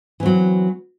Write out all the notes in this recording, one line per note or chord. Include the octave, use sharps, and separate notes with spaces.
E3 F#3 C4